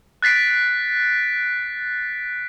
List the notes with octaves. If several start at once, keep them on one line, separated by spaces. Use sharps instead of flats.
F#6 A6 B6 C7 D7